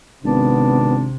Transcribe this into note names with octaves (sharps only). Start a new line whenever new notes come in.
G#1 C3 B3 D4